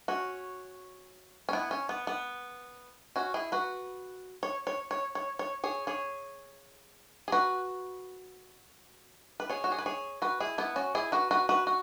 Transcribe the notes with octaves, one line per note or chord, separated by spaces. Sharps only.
C#4 F#4
C#4
B3 E4
C#4
B3
B3
C#4 F#4
E4 G#4
F#4 B4
C#5
C#5
C#5
C#5
C#5
G#4 C#5
G#4 C#5
G#4
F#4 B4
B4
G#4 C#5
F#4
G#4
B4
G#4 C#5
F#4 B4
E4 G#4
B3 E4
C#4 F#4
E4 G#4
F#4 B4
F#4 B4
F#4 B4
F#4